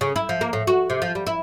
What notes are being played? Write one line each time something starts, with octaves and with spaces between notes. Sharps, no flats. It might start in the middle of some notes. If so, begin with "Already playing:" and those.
C#3
E4
F3
A#3
A2
F#4
C3
F3
G3
E4